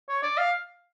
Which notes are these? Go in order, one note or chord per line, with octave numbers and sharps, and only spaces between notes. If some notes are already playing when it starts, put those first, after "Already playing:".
C#5
D5
F5